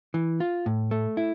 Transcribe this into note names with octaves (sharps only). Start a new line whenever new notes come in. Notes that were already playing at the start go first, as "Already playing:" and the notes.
E3
F4
A2
A3
E4